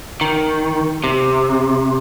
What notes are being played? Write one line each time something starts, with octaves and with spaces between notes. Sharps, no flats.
D#3
C3